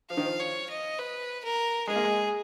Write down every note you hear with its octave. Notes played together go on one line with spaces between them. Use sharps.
F3 F5
D#3
F3
C#5
D#5
B4
A#4
G#3 G#4
A#3
G#3